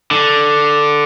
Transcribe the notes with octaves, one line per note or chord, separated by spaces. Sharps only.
D3